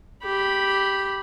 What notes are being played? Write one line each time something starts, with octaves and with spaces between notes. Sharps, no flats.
G4 B5